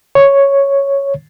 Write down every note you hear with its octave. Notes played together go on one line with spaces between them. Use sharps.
C#5